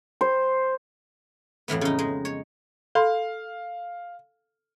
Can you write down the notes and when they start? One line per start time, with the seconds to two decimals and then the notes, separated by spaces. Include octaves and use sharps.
0.21 C5
1.68 F2 A2 E3 B3
1.81 C#3 D#4
1.99 G#3
2.25 C#5
2.95 A4 F5 B5 C6